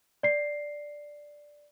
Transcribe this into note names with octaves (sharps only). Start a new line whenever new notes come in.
D5 C7